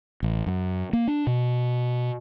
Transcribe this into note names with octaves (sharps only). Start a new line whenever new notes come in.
A1
F#2
A#3
D4
B2